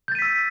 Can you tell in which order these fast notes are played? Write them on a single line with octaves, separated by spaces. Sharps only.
G6 A6 D#7 B6 E6